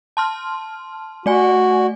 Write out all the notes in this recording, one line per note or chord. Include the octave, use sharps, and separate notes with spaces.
A5 C6 F6
A3 F#4 D5 G#5